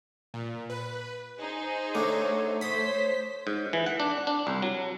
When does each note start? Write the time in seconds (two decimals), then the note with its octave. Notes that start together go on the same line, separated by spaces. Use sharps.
0.34 A#2
0.70 B4
1.39 D#4 G#4 C5
1.95 D3 A3 C#5
2.61 C5 B5 D#6 B6
3.47 G#2
3.73 E3
3.86 F#5
4.00 D4
4.27 D4
4.47 C2
4.62 F#3